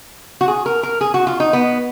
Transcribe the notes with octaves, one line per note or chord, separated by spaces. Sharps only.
F#4
G#4
A#4
A#4
G#4
F#4
F4
D#4
B3